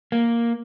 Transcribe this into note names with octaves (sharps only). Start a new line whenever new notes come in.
A#3